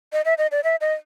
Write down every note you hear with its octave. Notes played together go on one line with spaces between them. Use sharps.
D#5
E5
D#5
D5
E5
D#5